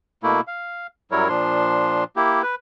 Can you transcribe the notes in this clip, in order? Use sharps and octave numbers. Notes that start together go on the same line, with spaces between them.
B2 A3 A#3 E4
F5
F#2 F#3 G3 E4 A#4 C#5
A#2 F3 D4 C6
A#3 E4 G4
B4